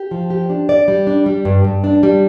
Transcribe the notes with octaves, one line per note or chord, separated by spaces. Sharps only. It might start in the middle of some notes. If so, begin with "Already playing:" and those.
Already playing: G4
F3
G4
D4
D5
G3
D4
G3
G2
G2
D4
G3